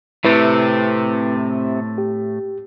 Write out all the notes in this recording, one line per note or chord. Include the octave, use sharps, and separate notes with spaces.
A2 C3 A3 E4 B4
G4